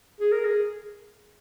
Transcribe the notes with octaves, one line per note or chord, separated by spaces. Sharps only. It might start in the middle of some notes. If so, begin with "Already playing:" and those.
G#4
A#4
G#4